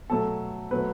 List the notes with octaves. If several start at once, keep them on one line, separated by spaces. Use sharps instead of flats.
B2 F#3 A3 A4
B2 F#3 A3 B4